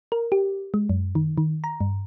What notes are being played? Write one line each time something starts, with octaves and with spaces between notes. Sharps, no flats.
A#4
G4
G#3
F#2
D#3
D#3
A#5
G2